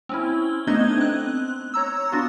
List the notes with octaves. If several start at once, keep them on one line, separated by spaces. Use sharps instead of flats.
C4 C#4 E4
A3 B3 D4 D#4 D#5 G#6
C4 F#6
C#5 A#5 E6
B3 D4 F4 F#4